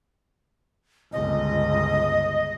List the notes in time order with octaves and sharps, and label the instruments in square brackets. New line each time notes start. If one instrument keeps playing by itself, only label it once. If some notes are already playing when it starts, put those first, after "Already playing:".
[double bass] G1 C#2 [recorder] D#5